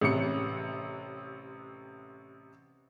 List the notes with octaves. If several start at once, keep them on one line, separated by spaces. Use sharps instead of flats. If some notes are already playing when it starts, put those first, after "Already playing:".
A1 C3 C#7